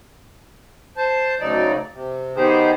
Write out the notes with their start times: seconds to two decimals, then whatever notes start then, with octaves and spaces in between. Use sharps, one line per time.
0.97 C5 A5
1.40 D2 C#3 F#3 D#4 D5
1.93 C3
2.36 D#3 B3 D#4 G4 G#4 C5